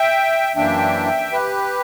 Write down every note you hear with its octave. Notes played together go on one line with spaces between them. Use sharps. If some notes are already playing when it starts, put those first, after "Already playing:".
Already playing: E5 G5
F#2 E3 A#3 D4 E5 G5
G4 B4